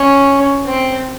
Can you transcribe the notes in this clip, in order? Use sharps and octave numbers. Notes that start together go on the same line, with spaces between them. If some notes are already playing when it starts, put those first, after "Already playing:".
Already playing: C#4
C4